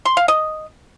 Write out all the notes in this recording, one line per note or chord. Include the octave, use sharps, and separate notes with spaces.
C6
F5
D#5